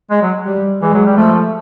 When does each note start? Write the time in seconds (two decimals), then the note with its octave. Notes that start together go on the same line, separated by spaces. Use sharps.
0.11 G#3
0.22 F#3
0.47 G3
0.81 E3 G#3
0.94 F#3
1.06 G3
1.17 F3 A3